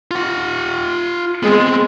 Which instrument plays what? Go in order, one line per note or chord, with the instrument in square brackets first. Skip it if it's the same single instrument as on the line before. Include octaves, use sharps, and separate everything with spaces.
[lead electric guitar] F4 F#5
[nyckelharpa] G#3 [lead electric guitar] B3 C4